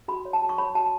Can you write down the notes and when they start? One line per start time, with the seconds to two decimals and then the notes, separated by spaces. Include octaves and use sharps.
0.08 F#4 B5
0.25 C#5
0.33 A5
0.42 F#4
0.49 C#6
0.58 C#5 B5
0.75 F#4 A5